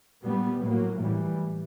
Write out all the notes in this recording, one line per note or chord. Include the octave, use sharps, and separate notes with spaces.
A#2 G3 B3
A2 F#3 A#3
A2 E3 G3